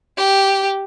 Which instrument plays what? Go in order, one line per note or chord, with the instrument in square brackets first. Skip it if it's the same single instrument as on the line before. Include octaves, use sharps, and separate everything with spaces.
[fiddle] G4